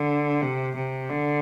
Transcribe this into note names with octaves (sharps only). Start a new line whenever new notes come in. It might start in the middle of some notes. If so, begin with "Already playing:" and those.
Already playing: D3
C3
C3
D3